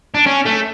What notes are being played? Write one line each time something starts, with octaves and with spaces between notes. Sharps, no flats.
D4
C#4
A3